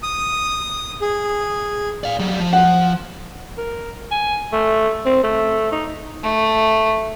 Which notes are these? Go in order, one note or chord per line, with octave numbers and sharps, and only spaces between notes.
D#6
G#4
D5 F5
F#3 G3
F3
F#5
A#4
G#5
A3
C4
A3
D#4
A3